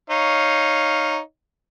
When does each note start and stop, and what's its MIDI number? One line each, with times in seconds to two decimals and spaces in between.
0.10 1.19 63
0.10 1.19 73
0.10 1.19 77